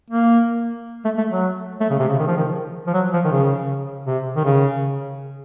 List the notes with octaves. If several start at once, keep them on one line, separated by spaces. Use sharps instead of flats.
A#3
A3
A3
F#3
A3
C#3
C3
C#3
D#3
F3
D#3
F3
F#3
F3
D#3
C#3
C3
D#3
C#3